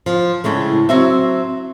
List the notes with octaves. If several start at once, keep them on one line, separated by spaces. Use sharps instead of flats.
F3
A2 C#3 G#3 A3
F#3 C4 F#4 E5